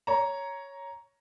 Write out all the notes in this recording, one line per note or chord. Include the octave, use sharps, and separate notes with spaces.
C#5 A#5